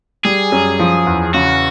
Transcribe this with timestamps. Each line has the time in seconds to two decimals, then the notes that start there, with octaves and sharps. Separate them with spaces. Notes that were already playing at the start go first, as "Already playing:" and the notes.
0.25 G3 G#4
0.52 F#2
0.79 F3
1.07 E2
1.34 C#3 F#4